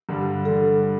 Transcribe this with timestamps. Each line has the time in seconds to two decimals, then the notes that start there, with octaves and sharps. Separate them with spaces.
0.09 G2 D3 G3
0.45 D3 G3 A4